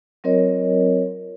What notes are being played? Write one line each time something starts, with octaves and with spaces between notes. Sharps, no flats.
F#3 C4 F4 A#4 C#5 D#5